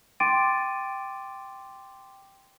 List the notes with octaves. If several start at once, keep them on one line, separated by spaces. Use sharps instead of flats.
G5 C6 D6 A6 D7 D#7